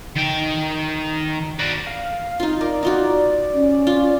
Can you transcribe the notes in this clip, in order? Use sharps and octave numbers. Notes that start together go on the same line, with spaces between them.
D#3 G5
F#4 D5
F5
D#4 F4
A#4 D5
D#4 F4 F#4
C#4
F4